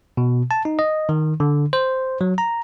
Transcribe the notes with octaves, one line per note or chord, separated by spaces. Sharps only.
B2
A5
D#4
D#5
D#3
D3
C5
F#3
A#5